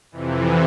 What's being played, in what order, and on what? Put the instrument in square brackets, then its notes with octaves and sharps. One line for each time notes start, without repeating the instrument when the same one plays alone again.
[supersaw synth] F2 C3 E3